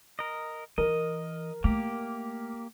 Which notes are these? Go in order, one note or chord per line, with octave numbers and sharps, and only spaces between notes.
A#4 D#5
E3 A#4 D#5
A3 A#3 G4